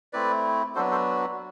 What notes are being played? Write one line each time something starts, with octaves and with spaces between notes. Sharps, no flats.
A3 C4 E4 B4 D5
F#3 B3 D4 F#4 A4 C5
A4 C5